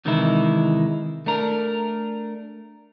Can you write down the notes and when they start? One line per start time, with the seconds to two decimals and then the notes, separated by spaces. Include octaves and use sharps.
0.05 C3 D#3 E3 G#3 D#4 E4
1.26 A3 D4 A#4